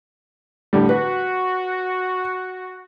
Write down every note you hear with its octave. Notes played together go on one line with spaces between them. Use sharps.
A2 D3 G3
F#4 B4